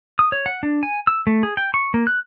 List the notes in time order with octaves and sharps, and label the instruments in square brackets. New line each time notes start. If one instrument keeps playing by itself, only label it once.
[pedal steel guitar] D#6
C#5
F#5
D4
G#5
E6
A3
G#4
G5
C#6
A#3
F#6